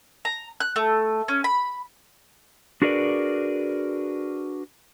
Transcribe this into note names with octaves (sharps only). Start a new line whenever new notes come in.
A#5
F#6
A3
C#4
B5
D4 F#4 G#4 A#4 B4 D5